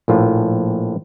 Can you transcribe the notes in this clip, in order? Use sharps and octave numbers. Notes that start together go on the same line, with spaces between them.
A#1 A2 F4